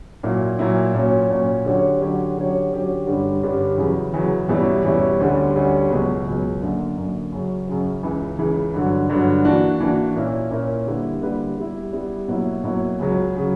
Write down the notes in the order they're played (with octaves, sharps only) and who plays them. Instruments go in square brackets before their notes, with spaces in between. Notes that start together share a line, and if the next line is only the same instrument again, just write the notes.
[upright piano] A#2 F#3 A#3 E4
A#2 F#3 A#3 E4
A#2 F#3 C#4
A#2 F#3 C#4
D3 F#3 C#4 G4 C#5
D3 F#3 C#4 G4 C#5
D3 F#3 C#4 G4 C#5
D3 F#3 C#4 G4 C#5
G2 D3 G3 C#4 G4
G2 D3 G3 C#4 G4
E2 C#3 F#3
E2 C#3 F#3
E2 B2 G3 C#4 E4
E2 B2 G3 C#4 E4
D2 D3 G3 C#4
D2 D3 G3 C#4
C#2 B2 F#3
C#2 B2 F#3
F#2 D3 A#3
F#2 D3 A#3
F#2 C#3 F#3
F#2 C#3 F#3
C#2 C#3 E3
C#2 C#3 E3
G2 D3 F#3
G2 D3 F#3
E3 A#3 D4 F#4
E3 A#3 D4 F#4
A#2 A#3 C#4 E4 A#4
A#2 A#3 C#4 E4 A#4
D3 G3 A#3 E4 B4
D3 G3 A#3 E4 B4
G3 B3 E4
G3 B3 E4
B2 F#3 A#3 E4
B2 F#3 A#3 E4
C#2 C#3 F#3
C#3 F#3